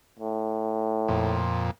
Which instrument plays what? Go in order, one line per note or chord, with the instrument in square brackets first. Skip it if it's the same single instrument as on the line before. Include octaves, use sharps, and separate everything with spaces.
[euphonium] A2
[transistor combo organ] F2 A#2